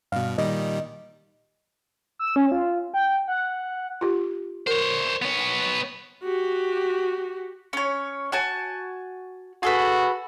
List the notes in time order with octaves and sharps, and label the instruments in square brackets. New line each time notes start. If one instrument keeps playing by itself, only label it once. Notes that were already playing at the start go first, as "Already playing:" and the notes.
[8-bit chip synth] G2 B2 [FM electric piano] F5
[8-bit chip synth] A#2 D#3 G3 [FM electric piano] D#5
[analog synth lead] E6
C#4
F4
G5
F#5
[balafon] F4 G4
[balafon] A#4 [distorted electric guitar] C5 C#5
[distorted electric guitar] B3 C#5
[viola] F#4 G4
[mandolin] C#4 C#5
F#4 G#5 A5
[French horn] F#4 [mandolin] G#4 A4 B4